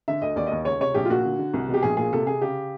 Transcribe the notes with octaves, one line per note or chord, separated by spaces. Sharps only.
D3 E5
D2 D#5
D#2 D5
D#2 D#5
C#2 C#5
C3 C#5
A#1 G4
F4
A#2 F#4
D3
D3
C2
B2
G4
A#1 G#4
A#2 G#4
C3 A4
C3 G#4
C#3 G4